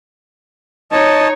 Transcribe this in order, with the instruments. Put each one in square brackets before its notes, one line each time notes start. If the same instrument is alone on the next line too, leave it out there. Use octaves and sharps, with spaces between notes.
[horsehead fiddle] D#4 C#5 [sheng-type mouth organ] D#5 A5